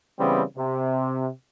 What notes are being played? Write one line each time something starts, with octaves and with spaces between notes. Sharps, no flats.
C#3 E3 G3 B3 C4
C3